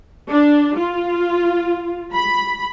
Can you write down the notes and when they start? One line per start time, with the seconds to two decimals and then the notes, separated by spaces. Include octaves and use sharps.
0.31 D4
0.77 F4
2.14 B5